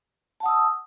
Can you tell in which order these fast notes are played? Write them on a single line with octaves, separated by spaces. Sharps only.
A5 F#5 D#6 E6